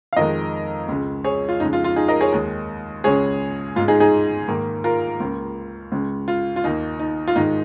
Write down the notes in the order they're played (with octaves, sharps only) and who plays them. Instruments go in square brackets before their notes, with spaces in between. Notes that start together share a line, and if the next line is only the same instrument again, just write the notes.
[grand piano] F5
F2 D#3 G#3 A#4 D#5
C#2 C#3 G#3
G#4 C#5
F4
F2 C#3 G#3 D#4
F4
F4
D#4 G#4
A#4 D#5
G#4 C#5
D#2 D#3 G#3
C#2 C#3 G#3 G#4 C#5
G#2 F4
G#3
D#4 G#4
D#4 G#4
G#2 D#3 A#3
F4 A#4
C#2 C#3 A#3
C#2 C#3 G#3
F4
F4
D#2 D#3 A#3 D#4
D#4
F4
G#2 D#3 G#3 D#4